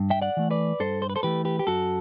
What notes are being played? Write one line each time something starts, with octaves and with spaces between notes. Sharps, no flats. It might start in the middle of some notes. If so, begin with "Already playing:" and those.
Already playing: G2
E5 G5
D5 F#5
E3 A3
B4 D5
G2 A4 C5
C5
B4
A4 C5
E3 A3 G4 B4
G4 B4
G4
F#2 F#4 A4